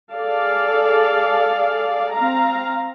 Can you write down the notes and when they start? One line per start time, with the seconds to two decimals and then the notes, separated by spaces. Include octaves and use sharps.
0.13 G#4 A4 D5 F5
2.14 C4 F5 A#5